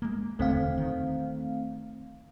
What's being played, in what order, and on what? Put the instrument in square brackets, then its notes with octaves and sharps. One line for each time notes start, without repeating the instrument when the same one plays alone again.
[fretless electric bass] G#3 A#3
[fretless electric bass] E1 D#2 D3 [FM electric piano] A3 C4 F5
[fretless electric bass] D#3